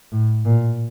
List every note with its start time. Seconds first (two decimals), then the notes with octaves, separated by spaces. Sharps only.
0.12 A2
0.45 A#2